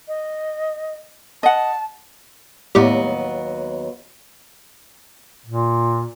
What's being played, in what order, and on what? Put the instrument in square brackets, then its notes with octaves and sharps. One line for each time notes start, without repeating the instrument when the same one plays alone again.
[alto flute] D#5
[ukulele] D#5 F#5 [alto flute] A5
[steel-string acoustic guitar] D#2 F#3 B3 [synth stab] A2 G3
[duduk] A#2